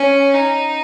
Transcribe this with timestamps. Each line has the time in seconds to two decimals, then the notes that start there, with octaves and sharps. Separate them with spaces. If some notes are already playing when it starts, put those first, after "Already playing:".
Already playing: C#4
0.34 D#4